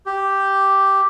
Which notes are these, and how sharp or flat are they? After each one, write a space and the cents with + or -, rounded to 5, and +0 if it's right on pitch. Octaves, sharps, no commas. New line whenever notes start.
G4 -5